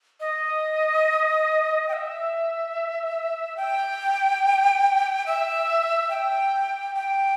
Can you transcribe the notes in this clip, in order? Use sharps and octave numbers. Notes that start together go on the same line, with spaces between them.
D#5
G5
E5
G5
E5
G5
G5